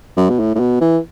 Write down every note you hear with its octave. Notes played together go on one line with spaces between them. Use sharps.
F#2
B2
A2
A2
B2
E3